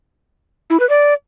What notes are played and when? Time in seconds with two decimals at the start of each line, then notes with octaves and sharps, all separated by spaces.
0.70 E4
0.80 B4
0.89 D5